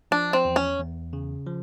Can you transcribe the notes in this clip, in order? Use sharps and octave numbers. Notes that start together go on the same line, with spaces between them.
F3 D4
C4
E2
C#4
E2
C#3
F3